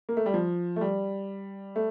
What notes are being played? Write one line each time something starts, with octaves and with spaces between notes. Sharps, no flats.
A#3
A3
G3
F3
A3
G3
A3